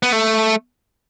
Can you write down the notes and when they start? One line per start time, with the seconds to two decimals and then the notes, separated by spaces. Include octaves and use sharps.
0.03 B3
0.12 A3